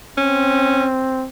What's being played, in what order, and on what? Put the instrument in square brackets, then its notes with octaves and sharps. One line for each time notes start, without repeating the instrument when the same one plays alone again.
[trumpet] C4 [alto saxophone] C#4